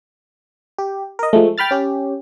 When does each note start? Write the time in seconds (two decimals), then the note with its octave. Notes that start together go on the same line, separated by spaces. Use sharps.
0.78 G4
1.19 A#4 D#5
1.33 F3 G#3 A3
1.58 G5 B5 F6 A6
1.71 C#4 G4